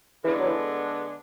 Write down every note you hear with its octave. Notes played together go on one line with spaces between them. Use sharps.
D3 E3 G#3 B3 D4 A4
F#3
E3